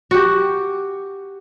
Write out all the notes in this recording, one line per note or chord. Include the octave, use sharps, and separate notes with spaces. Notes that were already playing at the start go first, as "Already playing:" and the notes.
F#4 G4